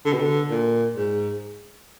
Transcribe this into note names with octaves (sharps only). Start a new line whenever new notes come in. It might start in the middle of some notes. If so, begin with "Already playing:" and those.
D3
B2
D3
A#2
G#2